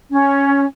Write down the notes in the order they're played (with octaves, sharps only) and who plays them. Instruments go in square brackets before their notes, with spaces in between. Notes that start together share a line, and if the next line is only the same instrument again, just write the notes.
[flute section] C#4